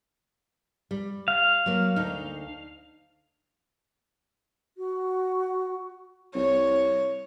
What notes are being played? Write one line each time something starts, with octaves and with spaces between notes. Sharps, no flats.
G3
F5
F#3 A#3
D2 D#4
F#4
C2 C#5